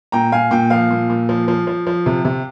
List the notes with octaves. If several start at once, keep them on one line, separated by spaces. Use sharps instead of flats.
A#2 G5 A#5
A#2 F5 G#5
A#2 G5
F3 F5
A#2
A#2
F3
F3
F3
F3
C3
C3